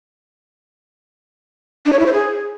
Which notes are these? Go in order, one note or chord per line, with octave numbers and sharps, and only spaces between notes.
D4
C#5
E4
C5
G#4